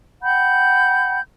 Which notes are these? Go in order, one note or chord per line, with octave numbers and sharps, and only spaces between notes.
F#5 G5 B5 G6